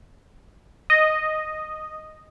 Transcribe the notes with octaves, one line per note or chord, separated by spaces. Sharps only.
D#5